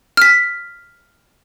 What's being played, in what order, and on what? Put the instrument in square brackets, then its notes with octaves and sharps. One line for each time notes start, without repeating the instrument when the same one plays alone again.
[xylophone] F6 B6